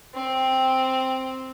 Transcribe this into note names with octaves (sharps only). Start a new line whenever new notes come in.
C4